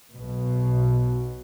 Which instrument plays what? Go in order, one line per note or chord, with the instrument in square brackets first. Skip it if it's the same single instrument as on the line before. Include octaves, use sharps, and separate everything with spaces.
[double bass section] B1 B2